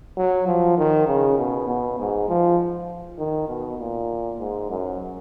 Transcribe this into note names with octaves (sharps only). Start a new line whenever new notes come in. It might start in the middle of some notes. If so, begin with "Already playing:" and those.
F#3
F3
D#3
C#3
B2
B2
G#2
F3
D#3
B2
A#2
G#2
F#2